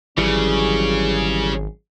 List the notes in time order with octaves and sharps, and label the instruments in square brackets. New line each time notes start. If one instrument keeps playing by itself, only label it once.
[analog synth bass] G#1 [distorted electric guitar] C#3 [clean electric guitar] E3 G3 [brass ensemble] F#3 C#4 G#4